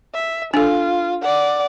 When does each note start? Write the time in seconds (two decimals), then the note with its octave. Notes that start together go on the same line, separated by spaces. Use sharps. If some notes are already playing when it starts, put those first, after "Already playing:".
0.14 E5
0.54 D4 F4 A4
1.22 D5 F#5